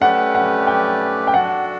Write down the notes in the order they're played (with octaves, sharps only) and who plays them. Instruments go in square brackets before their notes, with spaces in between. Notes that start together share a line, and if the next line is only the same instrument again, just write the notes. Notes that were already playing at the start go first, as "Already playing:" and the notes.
[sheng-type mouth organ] A3 C#4 G4 B4 D5 [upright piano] F#5
[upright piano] F#5
G5
G5
[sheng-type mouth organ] D4 F#4 A4 [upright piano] F#5